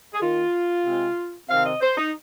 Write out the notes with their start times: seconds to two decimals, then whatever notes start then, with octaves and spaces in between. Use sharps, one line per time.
0.14 G#4
0.21 D#3 A#3 F4
0.85 C3 G#3 C4
1.49 C3 D#3 C4 F5
1.65 D#5
1.81 C5
1.97 D#4